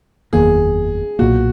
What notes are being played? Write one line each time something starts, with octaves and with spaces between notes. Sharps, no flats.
F#1 E2 D#3 A#3 G#4
B1 A#2 A#3 F#4